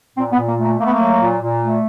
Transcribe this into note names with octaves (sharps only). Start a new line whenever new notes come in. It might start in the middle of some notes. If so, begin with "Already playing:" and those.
A#2 C4
B3
A#2
A#3
A3
A#3
A3 A#3
B3
A#3
F#3
A#2
A#2
A3